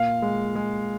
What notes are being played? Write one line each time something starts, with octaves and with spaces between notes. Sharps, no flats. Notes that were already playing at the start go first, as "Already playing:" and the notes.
Already playing: A#2 F5
G#3
G#3